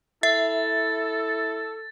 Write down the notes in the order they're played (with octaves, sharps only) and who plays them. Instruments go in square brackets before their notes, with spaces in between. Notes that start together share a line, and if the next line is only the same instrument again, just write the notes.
[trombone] E4 [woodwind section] A4 [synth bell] E5 [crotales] A6